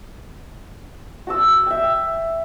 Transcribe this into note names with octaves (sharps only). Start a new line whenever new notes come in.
F#4 A5 E6
E5 G5